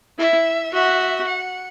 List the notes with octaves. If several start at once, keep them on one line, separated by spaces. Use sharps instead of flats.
E4 E5
F#4 E5
F#5